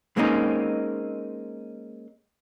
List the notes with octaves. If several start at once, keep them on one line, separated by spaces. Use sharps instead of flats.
G#3 A#3 C4 C#4 D#4